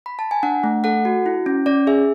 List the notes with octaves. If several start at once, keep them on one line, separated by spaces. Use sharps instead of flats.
B5
A5
G#5
D4 F#5
A3
A4 F#5
F#4
E4
C#4
C#4 D5
G#4 E5